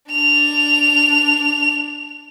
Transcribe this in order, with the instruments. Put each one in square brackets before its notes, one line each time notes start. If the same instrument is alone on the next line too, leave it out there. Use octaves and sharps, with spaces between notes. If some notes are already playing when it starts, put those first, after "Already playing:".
[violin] D4 F7